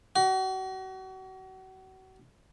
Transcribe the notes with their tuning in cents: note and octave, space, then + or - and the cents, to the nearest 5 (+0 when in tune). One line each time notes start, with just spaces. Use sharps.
F#4 +35